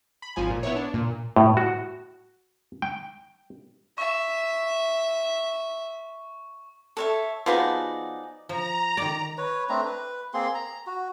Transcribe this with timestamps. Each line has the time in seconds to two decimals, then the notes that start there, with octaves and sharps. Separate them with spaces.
0.22 B5
0.36 G#1 F3 G#5
0.50 A#2
0.63 B3 E4 C#5
0.76 D4
0.94 A#2
1.36 A2
1.57 F#4
2.82 G5
3.98 E5 C#6
6.97 A4 C#5 E5
7.46 F3 B3 D#4 F#4 G#4 D5
8.49 F3 A#5
8.97 D#3 D5
9.38 B4 C#5
9.69 A3 C4 D4 A#5
9.85 B4
10.34 A#3 C4 G#4 C6
10.55 A#5
10.87 F#4